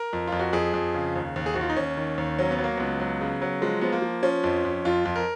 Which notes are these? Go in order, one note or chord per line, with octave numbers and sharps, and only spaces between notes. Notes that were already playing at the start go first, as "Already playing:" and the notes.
Already playing: A#4
F2
F2 F4
F#4
F2 G#4
F2
C#3
D#2
D#2
G#4
D#2 F#4
F4
D#4
D#2 C#4
D#3
D#2
F#3 C#4
B3
F#3
A#3
C#2 B3
F#3
C#3
F#3
F3 G#3
F3 B3
A#3
F3
F3 C#4
F2
F2
F2 F4
F2
A#4